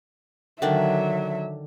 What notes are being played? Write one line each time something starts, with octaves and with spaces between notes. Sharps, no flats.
D3 D#3 F#3 D4 E5